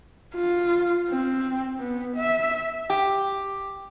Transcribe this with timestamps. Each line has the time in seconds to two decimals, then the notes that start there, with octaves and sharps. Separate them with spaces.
0.35 F4
1.09 C4
1.79 B3
2.17 E5
2.90 G4